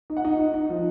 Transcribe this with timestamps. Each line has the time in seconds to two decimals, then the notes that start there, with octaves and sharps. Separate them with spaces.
0.10 D#4
0.17 F#5
0.25 D#4
0.39 D#4
0.54 D#4
0.70 F3